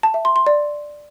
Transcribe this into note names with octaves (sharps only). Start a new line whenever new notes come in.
A5
E5
C6
C6
D5